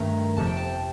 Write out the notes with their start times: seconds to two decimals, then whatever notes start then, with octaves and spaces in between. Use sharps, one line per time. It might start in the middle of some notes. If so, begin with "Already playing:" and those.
Already playing: G2 D#3 A3 A#5
0.37 G1 F2 C3 F3 A5
0.47 G5
0.57 A5